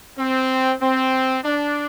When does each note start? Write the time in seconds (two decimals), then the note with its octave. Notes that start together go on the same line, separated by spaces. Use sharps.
0.18 C4
0.81 C4
1.44 D4